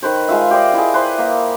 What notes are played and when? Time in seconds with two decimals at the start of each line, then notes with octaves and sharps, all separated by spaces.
0.02 D#3 B4 C5
0.28 G#3 F4 E5
0.51 G4 C5 D5 D#5
0.73 E4 G#4
0.94 B4 C5 E5 C6
1.18 A#3